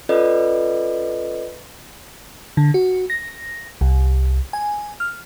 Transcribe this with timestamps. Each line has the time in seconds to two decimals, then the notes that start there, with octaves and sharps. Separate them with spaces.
0.09 C#4 F4 A4 B4 D5 D#5
2.57 D3
2.74 F#4
3.10 A#6
3.81 C2
4.53 G#5
5.00 F6